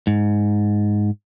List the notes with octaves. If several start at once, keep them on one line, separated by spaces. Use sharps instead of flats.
G#2